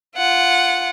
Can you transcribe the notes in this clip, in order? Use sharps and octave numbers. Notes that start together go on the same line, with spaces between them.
F4 F#5